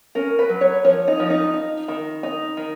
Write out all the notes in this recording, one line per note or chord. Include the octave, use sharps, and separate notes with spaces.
C#4 A#4
B4
F#3
C#5
F3 C#5
D#4
F3
D#4
D#4
D#3
D#4
D#3